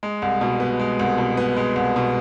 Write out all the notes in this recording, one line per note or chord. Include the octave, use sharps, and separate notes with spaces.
G#3
C2
B2
B3
G#3
C2
B2
B3
G#3
C2
B2